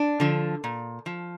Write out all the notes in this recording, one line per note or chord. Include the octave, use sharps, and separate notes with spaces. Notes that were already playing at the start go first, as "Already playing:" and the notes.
Already playing: D4
D3 F3
A#2
F3